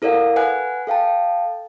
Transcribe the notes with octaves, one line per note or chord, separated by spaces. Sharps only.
E4 A4 A#4 D5 F5 F#5
B4 F#5 G#5 F#6
A4 F5 G5 A5